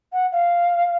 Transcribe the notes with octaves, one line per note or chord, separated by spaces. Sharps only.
F#5
F5